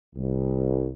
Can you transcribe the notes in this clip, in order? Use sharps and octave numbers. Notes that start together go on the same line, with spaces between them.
C2